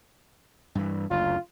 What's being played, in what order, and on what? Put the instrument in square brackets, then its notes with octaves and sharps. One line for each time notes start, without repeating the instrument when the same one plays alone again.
[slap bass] G2 E3
[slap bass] F#1 D2 [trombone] F4